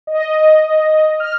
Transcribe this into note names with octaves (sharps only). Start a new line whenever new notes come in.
D#5
F6